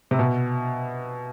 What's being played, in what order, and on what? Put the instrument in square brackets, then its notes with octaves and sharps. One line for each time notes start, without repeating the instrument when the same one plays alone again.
[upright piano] C3
B2